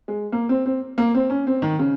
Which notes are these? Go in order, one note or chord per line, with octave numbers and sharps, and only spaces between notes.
G#3
A#3
C4
C4
A#3
C4
C#4
C4
D#3
C#3